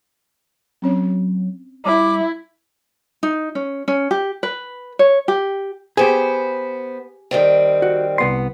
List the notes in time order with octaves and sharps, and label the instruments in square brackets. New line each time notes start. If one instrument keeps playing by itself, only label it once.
[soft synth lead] F#3 [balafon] C4 C#4 C#5
[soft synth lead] G3 [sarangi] E4 [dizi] D6
[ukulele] D#4
C#4
C#4
G4
B4
C#5
G4
[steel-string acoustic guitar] B3 C5 [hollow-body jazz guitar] G4 G#4
[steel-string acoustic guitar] D#3 G3 C4
[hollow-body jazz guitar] F#4
C2 B3 C6